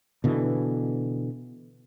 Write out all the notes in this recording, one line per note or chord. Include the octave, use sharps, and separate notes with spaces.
B2 D3 E3